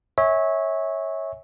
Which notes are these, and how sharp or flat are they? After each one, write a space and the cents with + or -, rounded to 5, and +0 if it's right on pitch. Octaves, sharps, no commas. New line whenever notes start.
C#5 -10 E5 -30 G#5 -20